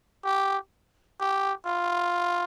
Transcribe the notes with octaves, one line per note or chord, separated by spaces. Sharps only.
G4
G4
F4